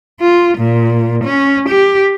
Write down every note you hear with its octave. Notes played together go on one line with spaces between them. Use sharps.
F4
A#2
C#4
G4